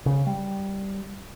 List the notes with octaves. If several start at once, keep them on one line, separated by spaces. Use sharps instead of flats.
C#3
G3